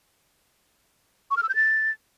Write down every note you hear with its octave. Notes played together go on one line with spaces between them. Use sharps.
C#6
F6
E6
G6
A6